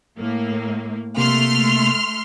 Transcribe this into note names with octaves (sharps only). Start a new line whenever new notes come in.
A2 A#3
C3 A3 A#3 C6 F6